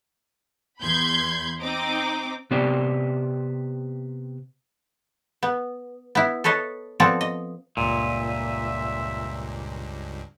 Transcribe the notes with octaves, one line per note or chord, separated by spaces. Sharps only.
E2 B5 C6 G6 G#6
C4 D#4 D6
C3 B3 G4 C5 D5
B3
B3 E4
A4 B4 C#5 D#5 A5
F3 B3 C4 A4 D5
D#5
C#2 G2 A#2 E5